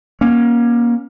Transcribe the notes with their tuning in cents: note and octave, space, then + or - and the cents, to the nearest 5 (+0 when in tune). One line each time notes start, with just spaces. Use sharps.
A#3 +25 C#4 +0